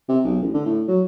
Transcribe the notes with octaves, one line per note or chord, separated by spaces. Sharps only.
C3
B1
A1
D3
A2
F#3